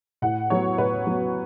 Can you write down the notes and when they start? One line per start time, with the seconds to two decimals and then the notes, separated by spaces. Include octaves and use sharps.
0.22 A2 F#5
0.50 F#3 B3 C#5
0.78 A2 B4
1.07 F#3 B3